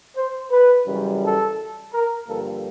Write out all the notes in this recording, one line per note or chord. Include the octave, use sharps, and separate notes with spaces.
C5
B4
F#2 C#3 E3 G3
A4
A#4
G2 D3 F3 A#3 A4